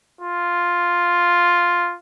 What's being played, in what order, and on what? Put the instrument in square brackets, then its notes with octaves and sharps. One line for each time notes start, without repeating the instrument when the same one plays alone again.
[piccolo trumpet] F4